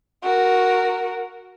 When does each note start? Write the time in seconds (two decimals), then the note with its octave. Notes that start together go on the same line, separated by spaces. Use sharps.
0.23 F#4 A#4